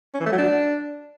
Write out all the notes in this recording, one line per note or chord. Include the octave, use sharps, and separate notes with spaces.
C#4
E3
A3
F#3
D4